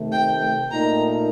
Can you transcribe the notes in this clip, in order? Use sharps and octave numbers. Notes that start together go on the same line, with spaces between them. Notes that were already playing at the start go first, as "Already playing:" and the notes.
Already playing: C3 D#3 A3
G5
G5
A#2 A3 D#4 A#4 A#5